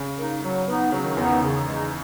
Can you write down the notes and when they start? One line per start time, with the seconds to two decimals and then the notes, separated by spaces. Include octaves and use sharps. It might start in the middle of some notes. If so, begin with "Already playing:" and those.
Already playing: C#3
0.17 A#3 D#4
0.42 F#3
0.68 B3 D#4
0.92 C#3 F#3
1.04 D#3
1.17 E2 E3 B3 D#4
1.26 C#3
1.29 D#3
1.42 C#3
1.67 G#3 D#4